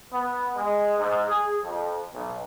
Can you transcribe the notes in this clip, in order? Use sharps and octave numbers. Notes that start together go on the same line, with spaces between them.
B3
G#3
G#2
G#4
F2
B1